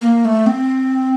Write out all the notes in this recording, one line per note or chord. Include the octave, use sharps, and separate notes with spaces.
A#3
A3
C4